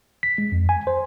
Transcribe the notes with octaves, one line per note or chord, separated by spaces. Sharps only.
B6
G#3
F2
G#5
C5